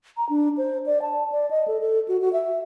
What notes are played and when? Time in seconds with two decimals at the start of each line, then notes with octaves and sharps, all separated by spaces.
0.17 A#5
0.29 D4
0.58 C5
0.86 D5
1.02 A5
1.32 D5
1.51 D#5
1.68 A4
1.81 A4
2.08 F#4
2.21 F#4
2.33 E5